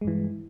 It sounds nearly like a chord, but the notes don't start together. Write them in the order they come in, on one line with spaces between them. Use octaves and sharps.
G#3 G2 E3